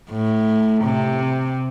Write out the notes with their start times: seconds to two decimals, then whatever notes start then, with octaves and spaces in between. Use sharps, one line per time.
0.11 A2
0.84 C3